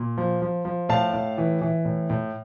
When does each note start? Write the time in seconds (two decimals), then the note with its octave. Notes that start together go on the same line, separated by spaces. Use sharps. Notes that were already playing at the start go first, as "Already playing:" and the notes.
Already playing: A#2
0.18 F3
0.42 F3
0.65 F3
0.89 A2 F5 A5
1.13 A2
1.38 E3
1.61 E3
1.85 A2
2.10 A2